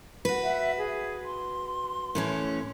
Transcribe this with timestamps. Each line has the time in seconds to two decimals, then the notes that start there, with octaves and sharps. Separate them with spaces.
0.25 F#4 B4
0.43 E5 F#5
0.79 G#4
1.24 C6
2.15 A2 E3 C#4